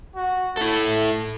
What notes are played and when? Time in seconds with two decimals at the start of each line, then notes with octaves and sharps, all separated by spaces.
0.16 F#4
0.57 A3 E4 A4